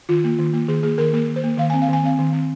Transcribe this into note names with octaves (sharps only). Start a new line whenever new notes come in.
D#3 F4
A#3
D#3
A#3
D#3 G#4
A#3 G#4
D#3 A#4
A#3 A#4
D#3
C5
A#3
D#3 F5
C4 G#5
F5
D#3 G#5
C4 F5
D#3
C4